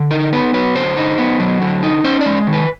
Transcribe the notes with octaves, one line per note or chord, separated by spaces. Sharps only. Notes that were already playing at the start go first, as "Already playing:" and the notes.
Already playing: D3
D#4 A#4
B3 B4
F#3 B4
D3 C5
D#4
B3
F#3
D3
D#4
C#4 C5
D5
G#3
D#3
B4